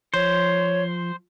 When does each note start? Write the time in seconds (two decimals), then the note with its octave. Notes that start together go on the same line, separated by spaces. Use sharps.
0.14 F3 C5 C#5